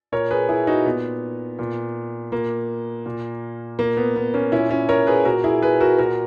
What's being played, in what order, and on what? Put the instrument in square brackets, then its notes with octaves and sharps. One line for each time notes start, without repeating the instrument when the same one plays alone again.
[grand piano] A#2 A#4 C#5
G#4 B4
E4 G#4
D#4 F#4
A#2 B3
A#2
A#2 A#3
A#2
A#2 A#3
B3
B3
A#3 C#4
A#2 C#4 E4
C#4 E4
A#4 C#5
G#4 B4
A#2 F#4 A#4
E4 G#4
G#4 B4
F#4 A#4
A#2 F#4 A#4